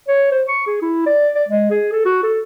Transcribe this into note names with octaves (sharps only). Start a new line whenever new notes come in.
C#5
C5
C#6
G#4
E4
D5
D5
G#3
G#4
A4
F#4
A4